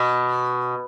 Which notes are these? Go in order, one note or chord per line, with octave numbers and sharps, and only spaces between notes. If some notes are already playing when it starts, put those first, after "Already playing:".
Already playing: B2